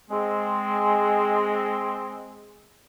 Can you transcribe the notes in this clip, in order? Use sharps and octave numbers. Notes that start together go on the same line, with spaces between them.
G#3 C4